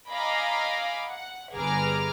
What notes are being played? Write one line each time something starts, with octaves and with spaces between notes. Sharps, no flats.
D#5 F5 G#5 A#5 B5 D6
F#5
G1 G#4 B4 A#5 D6 F6